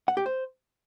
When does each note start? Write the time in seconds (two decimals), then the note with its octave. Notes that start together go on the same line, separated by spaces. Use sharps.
0.08 F#5
0.17 G4
0.26 C5